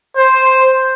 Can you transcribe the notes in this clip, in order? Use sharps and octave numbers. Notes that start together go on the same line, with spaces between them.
C5